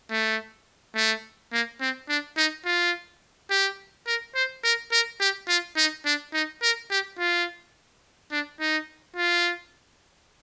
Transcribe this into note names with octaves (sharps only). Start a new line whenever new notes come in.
A3
A3
A#3
C4
D4
D#4
F4
G4
A#4
C5
A#4
A#4
G4
F4
D#4
D4
D#4
A#4
G4
F4
D4
D#4
F4